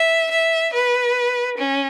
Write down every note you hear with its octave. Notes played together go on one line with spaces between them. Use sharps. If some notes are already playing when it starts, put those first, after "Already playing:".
Already playing: E5
E5
B4
C#4